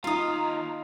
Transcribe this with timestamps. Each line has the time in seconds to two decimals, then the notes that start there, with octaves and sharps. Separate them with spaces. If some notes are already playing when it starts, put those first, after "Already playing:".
0.04 D#2 D#4 F4 F5 A#5 D#6